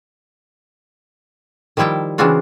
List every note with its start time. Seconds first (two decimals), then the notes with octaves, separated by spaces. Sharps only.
1.77 D#3 F3 G3 E4 G5 A5
2.18 C#3 E3 C4 D4 F4 F#4